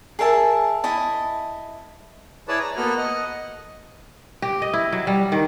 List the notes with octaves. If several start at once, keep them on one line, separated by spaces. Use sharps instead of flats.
G#4 A#4 E5 A5
E4 D#5 A5
E4 G#4 B4 C#5 D5 A5
A#5
A#3 B3 F#4 A4 B4 F6
D#5 F#5
G4
D#5
E4
F#3
G3
D#3